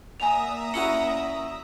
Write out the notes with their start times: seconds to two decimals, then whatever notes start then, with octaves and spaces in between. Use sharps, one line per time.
0.20 A#3 D5 E5 F#5 G#5 A#5 D#6 F7
0.74 C#4 E4 F#4 C#7